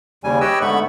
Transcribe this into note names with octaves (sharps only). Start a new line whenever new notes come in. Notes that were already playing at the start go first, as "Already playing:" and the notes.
D#2 C#3 G3 G#5
G4 B4 C#5 D#5 G5 E6
G#2 D3 A3 B3 B5 C#6